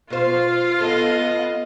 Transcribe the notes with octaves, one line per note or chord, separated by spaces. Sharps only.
B2 F4 C5 F5
B3 A4 D#5